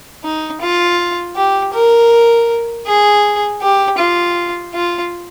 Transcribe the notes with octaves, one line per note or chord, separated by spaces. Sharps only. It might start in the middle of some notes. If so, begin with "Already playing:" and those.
D#4
F4
G4
A#4
G#4
G4
F4
F4